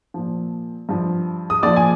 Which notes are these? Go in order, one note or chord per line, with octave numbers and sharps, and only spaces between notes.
A#2 F3
G2 F3
D#6
A#2 F3 D5 D6
G#5